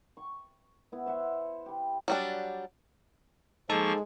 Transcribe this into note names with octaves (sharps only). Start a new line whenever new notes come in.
C#6
B3 E4
C5 E5 F#5
G4 B5
F#3 G3 D4
F3 G#3 A#3 D#4 A4 A5 C#6